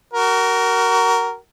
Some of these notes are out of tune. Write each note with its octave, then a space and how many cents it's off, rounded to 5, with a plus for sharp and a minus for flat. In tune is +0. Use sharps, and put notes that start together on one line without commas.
F#4 +25 A#4 +0